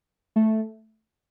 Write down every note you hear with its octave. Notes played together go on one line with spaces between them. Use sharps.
A3